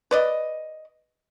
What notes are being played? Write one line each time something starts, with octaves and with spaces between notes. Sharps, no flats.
B4 D5 D#5